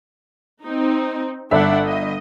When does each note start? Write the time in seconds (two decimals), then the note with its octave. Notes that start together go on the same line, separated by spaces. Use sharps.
0.63 C4 D#4
1.51 G1 D4 E5 F#5
1.85 D#5